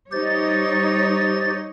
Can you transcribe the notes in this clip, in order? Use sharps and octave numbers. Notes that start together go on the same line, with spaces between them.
G3 D#4 G4 C5 C#5 A6